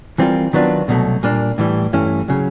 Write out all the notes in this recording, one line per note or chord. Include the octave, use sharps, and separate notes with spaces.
E3 G3 C4 F4 A#4
D#3 F#3 B3 D4 F4
C2 B2 F#3 A3
A#2 G3 A#3 D4
A2 E3 G3
G2 E3 A3 C#4 E4
C#3 F#3